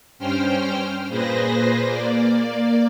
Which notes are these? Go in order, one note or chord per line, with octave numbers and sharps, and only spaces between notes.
G2 C#4 C5 G5 F6
A#2 G#4 B4 C5 A#6
A#3 D5